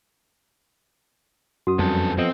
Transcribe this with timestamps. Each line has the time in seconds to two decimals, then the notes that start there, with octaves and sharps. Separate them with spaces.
1.67 F#2 F#4 D#6
1.79 F2 G3 B3 A4
2.18 F3 B3 C4 A4 D#5